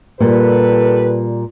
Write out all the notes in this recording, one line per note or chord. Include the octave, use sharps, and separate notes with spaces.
A#2 G3 G4 A4 B4